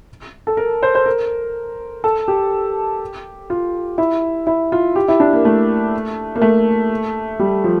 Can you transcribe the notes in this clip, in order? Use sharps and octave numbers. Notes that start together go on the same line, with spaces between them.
A4
A#4
C5
C5
A#4
A4
G4
F4
E4
E4
F4
G4
E4
D4
A#3
A3
A#3
A3
G3
F3